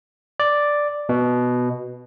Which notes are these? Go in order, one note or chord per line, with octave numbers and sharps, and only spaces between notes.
D5
B2